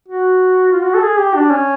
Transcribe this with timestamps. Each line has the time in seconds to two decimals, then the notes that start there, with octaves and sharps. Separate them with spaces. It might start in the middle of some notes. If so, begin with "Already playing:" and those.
0.08 F#4
0.72 F4
0.82 F#4
0.94 A4
1.03 G#4
1.19 G4
1.35 D4
1.51 C#4